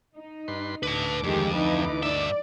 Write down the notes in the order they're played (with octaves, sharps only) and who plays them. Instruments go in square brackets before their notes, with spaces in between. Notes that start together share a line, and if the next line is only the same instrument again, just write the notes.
[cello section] D#4
[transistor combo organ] G2 B4 C6
[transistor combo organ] D2 D6 [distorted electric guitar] B4 A5
[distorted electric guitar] F2 [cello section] D#3 G#3 G4
[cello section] E3 D#4 B4
[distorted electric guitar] G2 E5 [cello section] D5